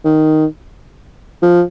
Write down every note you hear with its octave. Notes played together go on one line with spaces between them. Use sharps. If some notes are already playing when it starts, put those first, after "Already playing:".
D#3
F3